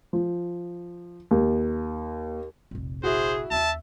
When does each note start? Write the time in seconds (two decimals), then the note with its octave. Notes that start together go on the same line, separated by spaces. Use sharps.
0.13 F3
1.31 D#2
2.71 F1 A#1
3.04 E4 F#4 G#4 C5
3.51 D#2 C#4 E5 A5